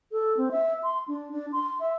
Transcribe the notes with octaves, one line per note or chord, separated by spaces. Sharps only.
A4
C4
E5
C6
D4
D4
C6
E5